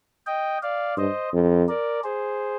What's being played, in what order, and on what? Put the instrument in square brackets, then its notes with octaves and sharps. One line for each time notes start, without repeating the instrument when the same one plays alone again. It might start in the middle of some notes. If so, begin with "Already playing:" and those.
[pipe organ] D#5 G5
D5 F5
[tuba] G2 [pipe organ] C5 D#5
[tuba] F2
[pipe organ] A#4 D5
G#4 C5